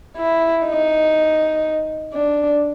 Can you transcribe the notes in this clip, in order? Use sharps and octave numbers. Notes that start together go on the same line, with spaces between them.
E4
D#4
D4